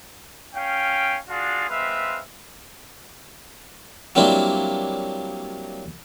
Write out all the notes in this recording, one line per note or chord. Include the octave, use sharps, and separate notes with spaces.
C#4 F5 G5
D4 F4 F#4 G#4 F5
G#3 C4 B4 E5 F5
F#3 G3 A#3 C4 D4 E4